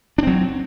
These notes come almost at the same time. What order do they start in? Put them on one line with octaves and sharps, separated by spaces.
D4 C4 F#3